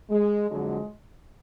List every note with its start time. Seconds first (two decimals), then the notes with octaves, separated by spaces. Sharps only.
0.10 G#3
0.50 F2 D3 F#3 G#3